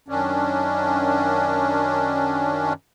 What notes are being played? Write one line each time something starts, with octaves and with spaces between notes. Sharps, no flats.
F#2 D#3 C#4 D4